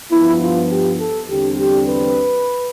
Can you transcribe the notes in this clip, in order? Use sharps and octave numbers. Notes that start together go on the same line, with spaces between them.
G2 F3 B3 E4
F4
G4
A4
E2 D3 G3 C4 G4
G4
B4